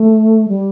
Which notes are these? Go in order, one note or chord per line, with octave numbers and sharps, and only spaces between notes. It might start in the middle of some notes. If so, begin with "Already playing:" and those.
Already playing: A3
G3